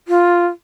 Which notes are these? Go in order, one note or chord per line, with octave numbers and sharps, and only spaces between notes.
F4